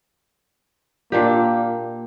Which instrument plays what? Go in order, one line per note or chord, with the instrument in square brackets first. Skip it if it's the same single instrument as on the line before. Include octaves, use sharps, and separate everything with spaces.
[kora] A#2 D4 G4 [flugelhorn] A#3